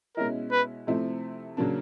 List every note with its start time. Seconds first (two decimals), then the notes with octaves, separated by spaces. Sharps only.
0.17 B2 G#3 C#4 E4 A#4
0.51 B4
0.87 C3 F3 A3 C4 E4
1.57 C#3 F#3 A#3 D4